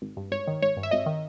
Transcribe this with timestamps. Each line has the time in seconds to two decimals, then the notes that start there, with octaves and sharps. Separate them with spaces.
0.02 G#1
0.17 G2
0.32 G#1 C#5
0.48 D#3
0.62 G#1 C#5
0.77 G2
0.83 E5
0.91 G#1 D#5
1.06 D#3